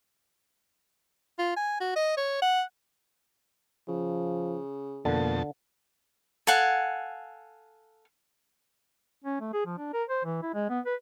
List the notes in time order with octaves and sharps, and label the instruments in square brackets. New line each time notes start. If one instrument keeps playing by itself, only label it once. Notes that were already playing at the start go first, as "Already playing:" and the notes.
[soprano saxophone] F4
G#5
F#4
D#5
C#5
F#5
[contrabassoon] C#3 [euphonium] F3
[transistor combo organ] F2 B2 A5 [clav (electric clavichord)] D3 [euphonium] A#3
[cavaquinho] A4 F5 F#5 G#5
[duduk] C#4
A3
G#4
F3
D4
A#4
C5
E3
E4
G#3
B3
B4